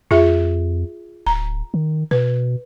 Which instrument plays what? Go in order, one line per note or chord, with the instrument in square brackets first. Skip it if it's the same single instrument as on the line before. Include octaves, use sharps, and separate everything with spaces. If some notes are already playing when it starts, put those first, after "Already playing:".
[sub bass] F2 [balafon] F4 G#4 E5
[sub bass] D1 [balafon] A#5
[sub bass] D#3
[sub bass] B2 [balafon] B4